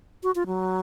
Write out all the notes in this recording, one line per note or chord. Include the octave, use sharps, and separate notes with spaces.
F#4
F4
F#3